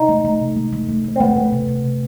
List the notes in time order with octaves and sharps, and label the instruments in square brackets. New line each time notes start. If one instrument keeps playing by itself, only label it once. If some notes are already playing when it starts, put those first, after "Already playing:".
Already playing: [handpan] C3 [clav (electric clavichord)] D#4
[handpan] A3
A3
C3
A3
A3
A3
A3
[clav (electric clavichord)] C4
[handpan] A3 [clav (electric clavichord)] B3
[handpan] A3
C3
C3
C3